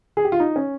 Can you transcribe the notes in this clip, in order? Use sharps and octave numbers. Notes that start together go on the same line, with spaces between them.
G#4
G4
F4
D#4
C#4